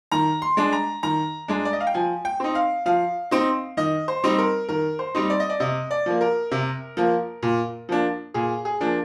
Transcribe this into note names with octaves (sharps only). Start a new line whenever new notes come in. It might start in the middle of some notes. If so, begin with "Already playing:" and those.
D#3 A#5
C6
G#3 D4
A#5
D#3 A#5
G#3 D4
D5
D#5
F5
G5
F3 G#5
G5
C4 D#4
F5
F3 F5
C4 D#4
D#3 D#5
C5
G3 C4 D#4
A#4
D#3 A#4
C5
G3 C4 D#4
D5
D#5
D5
C3 D#5
D5
F3 A#3
A#4
C3
F3 A#3
A#2
F3 A#3 D4
A#2 G#4
G#4
F3 A#3 D4